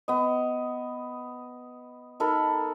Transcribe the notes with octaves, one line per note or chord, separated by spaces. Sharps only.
B3 D#5
D#4 A4 A#4 B5